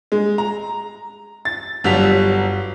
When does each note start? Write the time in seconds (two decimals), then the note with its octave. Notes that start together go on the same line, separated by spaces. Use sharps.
0.12 G#3
0.38 A#5
1.45 A6
1.84 G1 F#3 G3 B6 F7